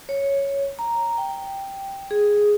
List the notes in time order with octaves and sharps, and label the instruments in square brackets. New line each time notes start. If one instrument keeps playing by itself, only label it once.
[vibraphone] C#5
A#5
G5
G#4